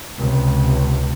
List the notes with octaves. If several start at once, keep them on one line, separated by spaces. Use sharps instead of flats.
C#2 C3